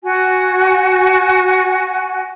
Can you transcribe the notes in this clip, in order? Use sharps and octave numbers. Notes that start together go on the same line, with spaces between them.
F#4 G#5